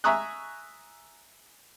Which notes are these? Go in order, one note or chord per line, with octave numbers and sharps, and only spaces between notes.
E5 G#5 A#5 C#6 D#6 F#6